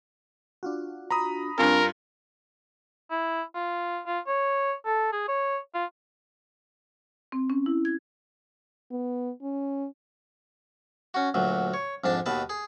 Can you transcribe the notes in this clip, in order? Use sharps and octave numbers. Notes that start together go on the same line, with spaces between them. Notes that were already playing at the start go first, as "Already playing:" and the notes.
D4 F4 F#4
A#5 B5 D#6
G2 C4 D4 F4 A#4 G#5
E4
F4
F4
C#5
A4
G#4
C#5
F4
C4
C#4
E4
G#6
B3
C#4
C#4 F#4
D2 A#2 F#3
C#5
F2 G#2 D4 A5
D#2 B2 B4 A5
G#4